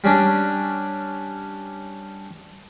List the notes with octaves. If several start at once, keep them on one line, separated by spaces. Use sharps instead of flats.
G3 C#4 D4